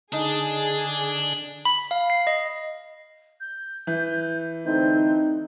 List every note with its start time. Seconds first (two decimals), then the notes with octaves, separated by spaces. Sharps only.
0.13 D3 D4 D#4 G#4 D#6
1.65 B5
1.91 F5
2.10 C7
2.27 D#5
3.40 G6
3.87 E3
4.66 D3 A3 C4 D#4 G6